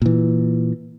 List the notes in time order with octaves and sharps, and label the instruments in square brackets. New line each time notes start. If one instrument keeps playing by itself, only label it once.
[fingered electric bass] A#2 E3